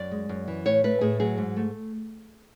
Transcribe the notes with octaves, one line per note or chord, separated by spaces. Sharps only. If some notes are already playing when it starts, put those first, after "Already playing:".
Already playing: F#2 D5
G#3
F#2
E3
A2 C#5
A3 B4
A2 G#4
F#3 G#4
G#2
A3